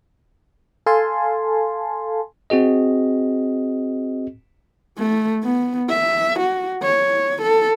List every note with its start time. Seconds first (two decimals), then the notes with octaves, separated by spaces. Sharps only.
0.86 A4 F5 G#5 A5 C6
2.50 C4 F#4 G#4 D#5
4.98 A3
5.43 B3
5.89 E5
6.40 F#4
6.83 C#5
7.43 A4